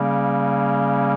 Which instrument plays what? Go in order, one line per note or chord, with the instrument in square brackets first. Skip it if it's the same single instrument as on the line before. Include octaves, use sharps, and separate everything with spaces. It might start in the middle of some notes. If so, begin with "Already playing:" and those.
Already playing: [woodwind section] C#3 G3 A#3 C#4